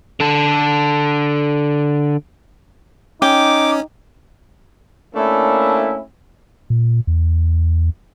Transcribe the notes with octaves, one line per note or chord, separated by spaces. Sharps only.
D3 A4
C#4 D#4 G5 D6
A3 A#3 C#4 D4 E4
A#2
E2